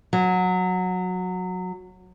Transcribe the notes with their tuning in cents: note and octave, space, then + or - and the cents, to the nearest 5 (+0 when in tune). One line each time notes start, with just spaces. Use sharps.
F#3 -15